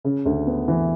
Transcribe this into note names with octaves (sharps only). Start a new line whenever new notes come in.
C#3
D2
B3
E3